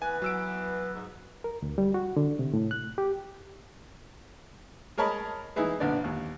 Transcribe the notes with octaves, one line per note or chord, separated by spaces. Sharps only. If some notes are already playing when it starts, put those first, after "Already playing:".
E3 B3 B4 G#5
F#3 E6 D7
G#2
A#4
D2
G3
F#4
D3
C3
A2
F#6
G4
G#4 A#4 C#5 D#5 A5 B5
E3 D#4 E4 G#4 B4
A#1 D3 B3 D5
D#2